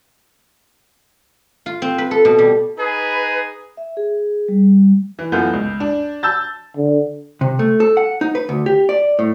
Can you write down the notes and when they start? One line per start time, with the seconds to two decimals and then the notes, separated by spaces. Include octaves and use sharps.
1.66 F4
1.82 C4
1.98 B4
2.11 A4
2.25 B2
2.38 G3
2.78 D#4 G#4 B4
3.77 E5
3.97 G#4
4.49 G3
5.19 E3
5.32 F#2 E3 B3 F4 A4 G6
5.53 C#2
5.80 D4
6.23 A5 E6 G6 A6
6.77 D3
7.41 C3
7.59 A3
7.80 A4
7.97 F#5
8.21 D#4
8.35 B4
8.49 D2
8.66 G4
8.89 D5
9.19 A2